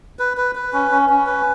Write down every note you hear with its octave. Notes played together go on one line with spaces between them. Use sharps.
B4
B4
B4
C#4
C#4
C#4
B4